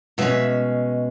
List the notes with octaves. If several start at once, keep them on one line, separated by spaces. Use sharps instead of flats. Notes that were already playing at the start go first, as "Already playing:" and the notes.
B2 G#3 C#4 E5